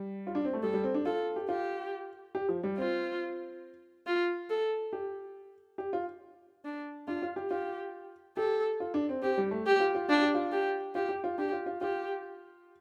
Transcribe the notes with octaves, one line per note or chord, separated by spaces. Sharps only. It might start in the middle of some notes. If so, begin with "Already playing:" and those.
Already playing: G3
F4
D4
C4
A3
G3 A4
G3
C4
D4
F4 A4
G4
F4 G4
G4
F3
G3
C4 F4
F4
A4
G4
G4
F4
D4
D4 F4
F4
G4
F4 G4
G4 A4
F4
D4
C4
C4 G4
G3
A3
G4
F4
F4
D4 F4
G4
F4
G4
F4 G4
G4
F4
D4 G4
F4
F4
F4 G4